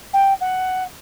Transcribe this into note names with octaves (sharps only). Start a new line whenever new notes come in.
G5
F#5